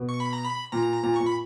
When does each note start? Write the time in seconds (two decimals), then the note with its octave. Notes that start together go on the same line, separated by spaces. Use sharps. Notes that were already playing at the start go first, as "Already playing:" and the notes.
Already playing: B2
0.09 C#6
0.20 B5
0.33 A#5
0.45 B5
0.72 A#2 A#5
1.03 A#2
1.16 A#2 C#6
1.26 B5